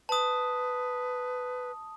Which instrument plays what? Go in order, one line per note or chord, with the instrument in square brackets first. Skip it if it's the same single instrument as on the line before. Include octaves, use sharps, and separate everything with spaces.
[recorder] B4 [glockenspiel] A5 D#6